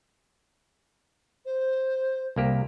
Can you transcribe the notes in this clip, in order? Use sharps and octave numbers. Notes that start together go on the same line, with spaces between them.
C5
C2 A#3 G4